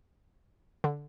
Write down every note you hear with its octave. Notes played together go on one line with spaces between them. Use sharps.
D3